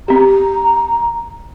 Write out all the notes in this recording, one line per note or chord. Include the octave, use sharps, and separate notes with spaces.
C4 G4 A#5